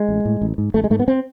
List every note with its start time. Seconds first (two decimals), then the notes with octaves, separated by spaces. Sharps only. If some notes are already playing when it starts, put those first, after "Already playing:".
Already playing: G#3
0.09 A1
0.25 A2
0.41 A1
0.58 G#2
0.74 A1 A3
0.84 G#3
0.90 G#2 A3
0.99 B3
1.08 C4